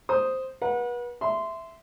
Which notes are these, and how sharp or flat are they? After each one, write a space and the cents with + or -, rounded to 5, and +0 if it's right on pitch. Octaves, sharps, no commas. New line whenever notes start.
C5 +0 D#6 +0
B4 -35 F#5 -25
E5 +0 C6 -15